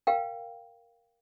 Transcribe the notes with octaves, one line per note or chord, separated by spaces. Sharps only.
A#4 F5 G5